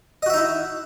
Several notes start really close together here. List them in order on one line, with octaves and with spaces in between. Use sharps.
D#5 F#4 E5 D#4 E4